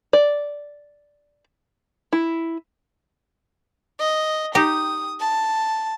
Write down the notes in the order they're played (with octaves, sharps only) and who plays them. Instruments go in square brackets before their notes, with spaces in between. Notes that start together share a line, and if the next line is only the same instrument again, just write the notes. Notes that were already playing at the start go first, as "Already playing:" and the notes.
[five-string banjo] D5
E4
[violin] D#5
[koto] D#4 G4 [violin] D#6
[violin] A5